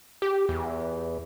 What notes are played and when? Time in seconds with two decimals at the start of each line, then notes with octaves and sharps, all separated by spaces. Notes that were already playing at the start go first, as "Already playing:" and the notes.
0.22 G4
0.49 E2